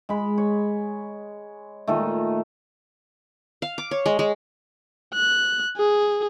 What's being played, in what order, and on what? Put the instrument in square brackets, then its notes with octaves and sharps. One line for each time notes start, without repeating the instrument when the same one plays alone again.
[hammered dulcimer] G#3 B5
C#5
A#2 D#3 A3
[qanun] F5
D6
C#5
G#3
G#3
[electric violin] F#6
G#4